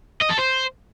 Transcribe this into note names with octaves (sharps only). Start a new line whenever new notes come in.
D#5
A4
C5